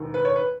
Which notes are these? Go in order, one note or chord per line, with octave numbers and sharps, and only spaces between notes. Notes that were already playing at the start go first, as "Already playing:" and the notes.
Already playing: E1 D#2 D#3
B4
C#5
B4